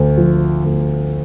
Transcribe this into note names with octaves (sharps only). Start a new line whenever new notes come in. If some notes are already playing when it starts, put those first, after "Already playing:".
Already playing: D2
F3
D2